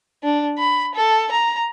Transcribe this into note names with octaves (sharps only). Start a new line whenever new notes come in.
D4
B5
A4
A#5